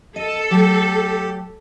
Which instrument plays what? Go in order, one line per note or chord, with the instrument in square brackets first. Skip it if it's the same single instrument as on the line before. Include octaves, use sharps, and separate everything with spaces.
[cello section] A4 [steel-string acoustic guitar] D#5
[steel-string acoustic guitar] F#3 A3 [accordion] G4